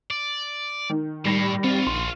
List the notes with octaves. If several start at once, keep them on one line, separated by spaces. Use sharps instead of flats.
D5
D#3
A2 D#3 G3 B5 A#6
C4 F4 F#4
A#1 C6